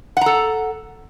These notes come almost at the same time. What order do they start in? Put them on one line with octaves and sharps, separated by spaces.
F#5 A#5 A4